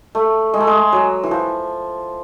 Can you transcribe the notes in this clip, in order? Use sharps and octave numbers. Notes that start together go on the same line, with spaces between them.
A3
G#3
A3
G#3
F#3
E3
F3